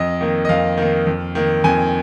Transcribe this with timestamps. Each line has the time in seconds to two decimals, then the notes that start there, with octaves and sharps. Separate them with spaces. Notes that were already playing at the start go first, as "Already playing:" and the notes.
Already playing: F2 D#5
0.21 D#3 A#3
0.45 D#5
0.49 F2 F5
0.78 D#3 A#3
1.06 F2
1.35 D#3 A#3
1.64 F2 G#5